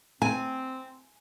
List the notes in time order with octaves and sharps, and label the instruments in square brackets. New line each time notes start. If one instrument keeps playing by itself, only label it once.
[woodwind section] C4 [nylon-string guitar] G#5